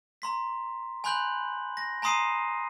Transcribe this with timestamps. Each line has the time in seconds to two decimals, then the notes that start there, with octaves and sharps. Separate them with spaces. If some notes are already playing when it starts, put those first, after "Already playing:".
0.22 A#5 C6 B6
1.04 G#5 B5 C6 F#6 G6 F#7
1.77 A#6
2.02 G#5 A#5 C6 D#6 C7 D#7